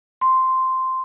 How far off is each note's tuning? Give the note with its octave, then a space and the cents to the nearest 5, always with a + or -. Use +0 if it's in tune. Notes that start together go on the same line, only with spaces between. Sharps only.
C6 -5